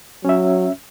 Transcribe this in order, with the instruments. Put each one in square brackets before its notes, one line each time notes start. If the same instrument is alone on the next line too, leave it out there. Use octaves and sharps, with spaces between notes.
[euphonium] F#3 [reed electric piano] C#4 E5